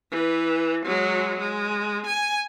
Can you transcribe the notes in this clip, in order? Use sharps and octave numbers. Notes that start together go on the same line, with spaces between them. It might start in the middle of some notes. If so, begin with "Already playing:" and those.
E3 B4
F#3 G#3
G#3
G#5